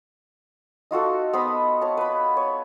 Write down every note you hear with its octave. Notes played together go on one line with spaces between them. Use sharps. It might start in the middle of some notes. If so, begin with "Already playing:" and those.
D#4 F4 F#4 A4
B3 C5 D#5 B5
C#5 A5
B4 B5
C#5